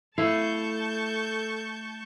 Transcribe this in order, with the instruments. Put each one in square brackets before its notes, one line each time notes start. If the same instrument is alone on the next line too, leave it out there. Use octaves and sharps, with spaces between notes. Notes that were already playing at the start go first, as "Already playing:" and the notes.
[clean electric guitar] A3 F5 [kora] E4 [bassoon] A4 [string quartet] A5 C#6 G6